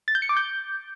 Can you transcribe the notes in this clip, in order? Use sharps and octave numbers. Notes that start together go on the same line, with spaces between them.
A6
G6
C#7
D6
G6